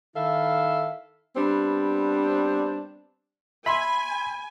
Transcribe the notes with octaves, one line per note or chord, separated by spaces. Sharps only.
D#3 E4 A4 E5 F5
G3 B3 C4 D4
E5 G#5 B5 C6